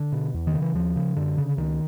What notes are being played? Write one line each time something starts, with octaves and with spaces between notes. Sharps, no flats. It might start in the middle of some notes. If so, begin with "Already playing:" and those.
Already playing: D3
B2
E2
D#3
C#3
E3
D#2 F3
C#3
F#2 D3
C#3
C#2 D#3